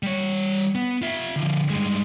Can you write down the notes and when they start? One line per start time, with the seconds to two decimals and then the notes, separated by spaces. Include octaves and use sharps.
0.03 G3 C#5
0.75 B3
1.02 F4 E5
1.36 D3 F3
1.70 G2 G#3